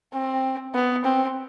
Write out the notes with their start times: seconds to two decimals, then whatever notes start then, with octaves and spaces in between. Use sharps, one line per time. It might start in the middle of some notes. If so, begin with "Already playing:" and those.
0.13 C4
0.75 B3
1.05 C4